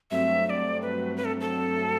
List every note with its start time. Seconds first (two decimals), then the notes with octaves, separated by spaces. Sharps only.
0.11 G2 F#3 A3 C4 E5
0.46 E5
0.50 D5
0.82 B4
1.17 B4
1.25 A4
1.40 A4